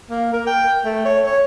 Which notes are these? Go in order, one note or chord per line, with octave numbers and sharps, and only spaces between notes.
A#3
A#4
G5
A3
C#5
C#5